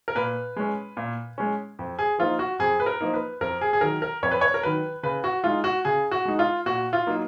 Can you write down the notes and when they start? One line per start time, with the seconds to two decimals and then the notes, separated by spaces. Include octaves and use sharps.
0.08 A#4
0.15 A#2 B4
0.56 G#3 C#4
0.97 A#2
1.38 G#3 C#4
1.79 F2
1.99 G#4
2.18 F3 A#3 D#4 F4
2.39 F#4
2.59 F2 G#4
2.80 B4
2.86 A#4
3.01 F3 A#3 D#4
3.14 B4
3.41 F2 A#4
3.61 G#4
3.73 G#4
3.81 D#3 F#3 A#4
4.02 A#4
4.23 F2 C#5
4.31 B4
4.41 C#5
4.54 A#4
4.63 D#3 F#3 B4
5.03 C#3 B4
5.24 F#4
5.44 G#3 D#4 F4
5.64 F#4
5.85 C#3 G#4
6.11 F#4
6.25 G#3 D#4
6.39 F4
6.66 A#2 F#4
6.93 F4
7.07 F#3 A#3 D#4